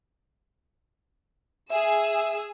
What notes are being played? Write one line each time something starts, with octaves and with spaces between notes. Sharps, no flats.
G#4 E5 E6